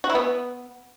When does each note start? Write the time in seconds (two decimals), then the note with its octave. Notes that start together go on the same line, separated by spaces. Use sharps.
0.04 F#4
0.09 E4
0.15 B3